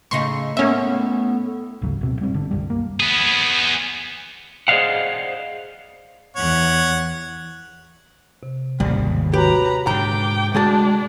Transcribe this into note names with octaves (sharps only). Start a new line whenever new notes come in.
A2 C#3 D#4 C6 C#6
A2 A#3 B3 C#4 E5
G#1 D2 C#3 F#3
D1 B2 C4
F1 G3 C4
G1 D3
C2 F#2 G3
A#3
B3 G#4
G#4 C5 D5 D#5 F5 F#5
E2 C#5 F#5
C3
G#1 D#2 C#3 G3
F#4 G4 B4 C#5 A#5
G#2 D3 G5 A#5 D6
D2 G#3 D4 G#4 A5 A#5 D6